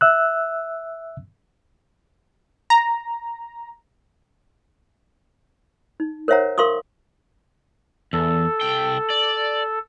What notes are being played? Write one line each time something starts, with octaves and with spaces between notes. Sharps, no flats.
E5 E6 F#6
A#5
D#4
A#4 C5 C#5 E5 F#5 A#5
A#4 F5 C6 C#6 D#6
E2 A4
C2 G5
D5